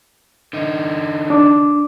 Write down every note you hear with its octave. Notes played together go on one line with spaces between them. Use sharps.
D3 D#4
D4 D6